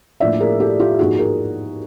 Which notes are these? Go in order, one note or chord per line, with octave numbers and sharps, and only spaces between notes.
A2 F3 A#3 D4 D5 E5
G#4 A#4
G4 A4
F4 G4
G#2 F3 A#3 D#4 F#4 G#4
G#4 A#4